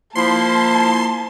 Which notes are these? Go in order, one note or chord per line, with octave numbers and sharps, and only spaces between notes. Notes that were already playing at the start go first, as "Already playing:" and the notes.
F3 A#3 E4 A5 C6